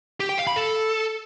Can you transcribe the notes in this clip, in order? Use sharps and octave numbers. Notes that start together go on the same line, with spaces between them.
G4
G5
F5
B5
A4